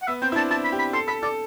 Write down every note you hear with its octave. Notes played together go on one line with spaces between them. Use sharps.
F#5
B3 E5
C4 G5
E4
D4 A5
E4 A5
B5
G4
B5
A4 C6
A4 B5
A4 D5